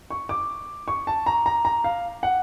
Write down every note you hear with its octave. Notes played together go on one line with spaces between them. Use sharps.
C#6
D6
C#6
A5
A#5
A#5
A#5
F5
F#5